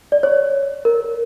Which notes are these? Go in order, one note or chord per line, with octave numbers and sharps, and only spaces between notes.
D5
C#5
A#4